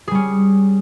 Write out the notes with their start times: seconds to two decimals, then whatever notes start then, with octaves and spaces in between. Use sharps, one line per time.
0.08 G#4
0.11 G3
0.15 C#4